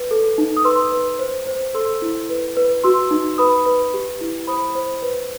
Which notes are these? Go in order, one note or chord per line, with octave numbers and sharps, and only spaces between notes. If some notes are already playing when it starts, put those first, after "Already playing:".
Already playing: B4
A4
D#4
D#6
B4 C6 E6
B4
C5
C5
A4 C6 E6
E4
B4
B4
F#4 C6 E6
D#4
B4 B5 D#6
B4
G4
E4
C5 B5 D#6
C5
B4